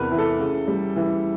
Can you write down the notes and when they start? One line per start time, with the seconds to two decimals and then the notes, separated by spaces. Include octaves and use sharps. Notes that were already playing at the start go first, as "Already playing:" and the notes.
Already playing: E2 C3 A#4 B4
0.12 E3
0.18 A4
0.40 C#3
0.67 G3
0.96 E3